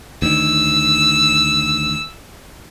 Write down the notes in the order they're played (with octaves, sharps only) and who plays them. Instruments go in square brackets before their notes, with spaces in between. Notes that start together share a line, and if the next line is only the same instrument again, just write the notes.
[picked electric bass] D2 D#3 [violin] E6